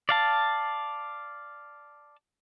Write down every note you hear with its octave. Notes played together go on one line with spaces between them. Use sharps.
D5 F5 A5